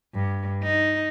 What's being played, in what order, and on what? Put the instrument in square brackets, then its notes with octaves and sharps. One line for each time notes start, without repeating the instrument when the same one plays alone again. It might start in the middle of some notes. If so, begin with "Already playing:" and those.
[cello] G2
D#4